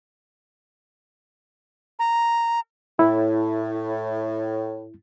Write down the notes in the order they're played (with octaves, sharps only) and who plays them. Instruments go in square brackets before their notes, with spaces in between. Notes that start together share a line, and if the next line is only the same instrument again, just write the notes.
[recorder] A#5
[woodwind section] A2 [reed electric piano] E4